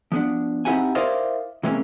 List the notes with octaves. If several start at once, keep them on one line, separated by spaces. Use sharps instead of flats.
F3 B3 D4
C4 D#4 E4 G4 F#5 G#5
E4 A#4 C5 D5 D#5 F5
C3 E3 G#3 A#3 C#4